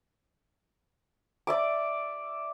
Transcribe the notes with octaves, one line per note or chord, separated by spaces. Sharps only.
D5 E5 D6